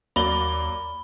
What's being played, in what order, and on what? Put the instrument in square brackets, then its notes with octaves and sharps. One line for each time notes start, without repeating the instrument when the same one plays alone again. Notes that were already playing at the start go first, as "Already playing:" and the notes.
[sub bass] D#2 [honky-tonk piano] F#3 A#3 D5 [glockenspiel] B5 G7